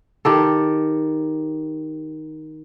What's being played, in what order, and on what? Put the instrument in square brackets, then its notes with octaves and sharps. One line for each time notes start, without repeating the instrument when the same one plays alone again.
[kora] D#3 G4 A4